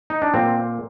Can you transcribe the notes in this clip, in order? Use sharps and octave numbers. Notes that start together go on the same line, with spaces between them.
D#4
D4
A#2 C4